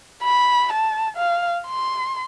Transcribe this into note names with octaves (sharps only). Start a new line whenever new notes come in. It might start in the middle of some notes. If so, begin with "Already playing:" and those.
B5
A5
F5
C6